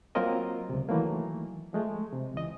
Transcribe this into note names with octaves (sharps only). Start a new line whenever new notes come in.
F#3 A#3 C4 F4 A#4 D#5
C#2 C3
D#3 E3 F#3 A3 A#3
F3 G#3 A3
C3
C#2 E3 D#5